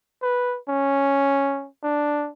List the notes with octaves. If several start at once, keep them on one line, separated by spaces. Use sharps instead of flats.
B4
C#4
D4